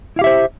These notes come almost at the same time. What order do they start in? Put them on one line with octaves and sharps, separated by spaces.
E4 F5 G4 E5 C5